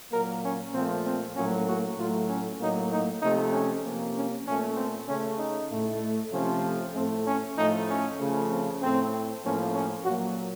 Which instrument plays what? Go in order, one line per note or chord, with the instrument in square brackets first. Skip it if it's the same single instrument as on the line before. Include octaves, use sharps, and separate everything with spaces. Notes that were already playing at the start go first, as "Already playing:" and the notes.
[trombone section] A#2 F#3 A#3 A#4
C#4
A#2 F3 A3 C4
C4
A2 F#3 A#3 C#4
F#4
A2 F#3 A3 F4
C#4
A2 F#3 A#3 D#4
D#4
C3 F3 A3 D#4
C#4
C3 F3 A#3
C#4
A#2 A3 C#4
C4
C#3 A3 C#4
D#4
A2 A3
C3 F3 A3 C#4
A2 A3 C4
C#4
A2 F3 A3 D#4
C#4
C#3 F3 A3
C4
A2 A3 C4
A2 F3 A#3 C#4
C#4
A#2 F#3 A#3 F#4